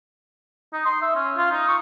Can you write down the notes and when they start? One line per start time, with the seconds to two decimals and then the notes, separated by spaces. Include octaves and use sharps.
0.73 D#4
0.85 C6
1.02 E5
1.16 C#4
1.37 F4
1.51 D#4
1.68 C#6